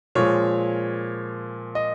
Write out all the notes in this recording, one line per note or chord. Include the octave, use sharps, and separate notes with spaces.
A#2 F3 G#3 C#5
D#5